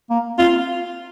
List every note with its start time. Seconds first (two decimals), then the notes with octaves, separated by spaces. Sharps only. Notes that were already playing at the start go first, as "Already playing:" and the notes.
0.10 A#3
0.38 C4 F4